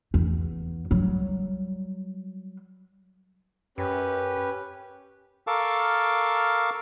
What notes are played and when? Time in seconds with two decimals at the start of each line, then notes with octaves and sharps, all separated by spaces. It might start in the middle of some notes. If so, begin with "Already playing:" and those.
0.14 E2
0.91 F#3 G3
3.78 F#2 C#4 G4 B4
5.47 A4 A#4 F5 A5 C#6 D6